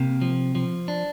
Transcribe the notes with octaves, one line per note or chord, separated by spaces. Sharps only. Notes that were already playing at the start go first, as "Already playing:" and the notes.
Already playing: C3 A#3
F3
F3
D4